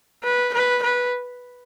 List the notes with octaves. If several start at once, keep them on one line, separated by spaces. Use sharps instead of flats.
B4
B4
B4